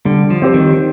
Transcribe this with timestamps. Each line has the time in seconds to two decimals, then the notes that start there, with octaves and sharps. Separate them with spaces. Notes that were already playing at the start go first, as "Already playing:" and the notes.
0.05 D3 G3
0.30 F3
0.42 C4 G4 C5
0.54 D#3